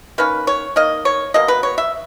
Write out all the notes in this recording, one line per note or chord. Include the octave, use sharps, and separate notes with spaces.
D#3 A#3 C#4 B4
C#5
D#3 A#3 D#5
C#5
B2 A#3 D#5
B4
C#5
E5